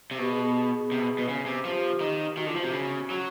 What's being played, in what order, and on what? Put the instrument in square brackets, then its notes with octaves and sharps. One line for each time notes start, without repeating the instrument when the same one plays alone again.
[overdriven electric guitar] C3
[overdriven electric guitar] B2 [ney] G4
[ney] G#4
G#4
G#4
[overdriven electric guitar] C3
B2
B2
C#3
C3
[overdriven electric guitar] F3 [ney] G4
[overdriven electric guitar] D#3
[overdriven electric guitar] D#3 [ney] F#4
[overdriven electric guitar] D3
[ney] F4
[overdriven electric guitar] F3
[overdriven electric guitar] C3 [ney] F#4
[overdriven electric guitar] C#3
F#3